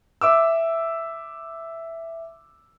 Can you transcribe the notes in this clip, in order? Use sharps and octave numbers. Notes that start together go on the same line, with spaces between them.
E5 D6 E6